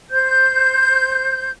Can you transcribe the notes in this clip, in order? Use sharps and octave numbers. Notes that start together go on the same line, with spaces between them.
C5 G6